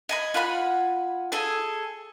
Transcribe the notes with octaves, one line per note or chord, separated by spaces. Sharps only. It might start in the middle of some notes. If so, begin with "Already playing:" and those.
D#5 G#5 B5
F4 F#5 G#5 B5
G#4 A4 G#5